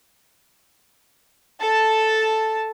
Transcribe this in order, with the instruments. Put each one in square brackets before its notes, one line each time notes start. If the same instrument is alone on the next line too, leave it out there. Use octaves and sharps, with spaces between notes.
[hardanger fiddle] A4 A5